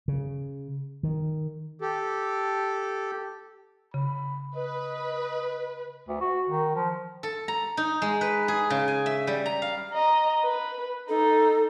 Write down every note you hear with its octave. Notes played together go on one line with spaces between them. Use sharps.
C#3
D#3
G4 A4
C#3 B5
B4 D#5
D2
F#4
D#3
F3
A4
A#5
D#4
G#3
B4
G#4
C#3
G#5
E5
G3
A#5
F5
D#5 A#5
B4
D#4 A4